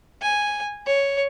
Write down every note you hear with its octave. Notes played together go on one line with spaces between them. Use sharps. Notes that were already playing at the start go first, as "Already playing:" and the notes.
G#5
C#5